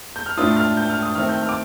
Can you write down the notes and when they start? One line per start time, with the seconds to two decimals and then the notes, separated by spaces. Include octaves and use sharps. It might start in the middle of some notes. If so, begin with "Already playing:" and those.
0.16 G6
0.26 F6
0.37 A2 A3 D4 F4 D#6
0.56 F6
0.77 G6
0.90 F6
1.03 D#6
1.15 D#3 A3 C4 D#4 F6
1.29 G6
1.42 F6
1.49 D6